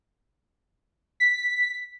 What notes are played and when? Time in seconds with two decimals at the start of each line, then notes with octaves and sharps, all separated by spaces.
1.20 B6